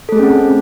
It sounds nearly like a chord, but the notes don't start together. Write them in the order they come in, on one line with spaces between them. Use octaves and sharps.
A4 A3 G#4 C#4 C4